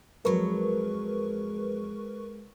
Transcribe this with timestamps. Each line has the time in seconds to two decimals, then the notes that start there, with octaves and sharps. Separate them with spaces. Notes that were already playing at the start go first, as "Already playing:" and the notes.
0.25 F2 F#3 G#3 A#4 B4 C#6